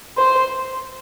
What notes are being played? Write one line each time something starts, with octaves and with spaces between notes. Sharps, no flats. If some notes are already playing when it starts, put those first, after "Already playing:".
C5